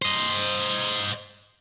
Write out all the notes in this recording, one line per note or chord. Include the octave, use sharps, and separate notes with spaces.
C5 D#5